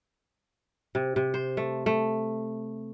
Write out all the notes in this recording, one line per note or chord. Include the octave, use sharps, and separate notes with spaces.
C3
C3
C5
A3
A3